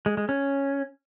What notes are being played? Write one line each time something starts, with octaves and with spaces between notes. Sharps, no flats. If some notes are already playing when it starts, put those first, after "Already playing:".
G#3
G#3
C#4